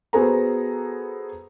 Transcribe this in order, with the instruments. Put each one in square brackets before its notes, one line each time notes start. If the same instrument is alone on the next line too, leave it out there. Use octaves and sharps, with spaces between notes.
[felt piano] B3 F#4 G#4 A4 C5 A#5